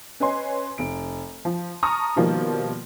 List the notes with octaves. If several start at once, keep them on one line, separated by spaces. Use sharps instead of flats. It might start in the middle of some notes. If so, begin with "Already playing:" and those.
C#4 B4 C#5 D#5 G#5 C6
F1 D7
F3
A5 A#5 C#6 D#6 F6
B2 D#3 F3 G3 A#3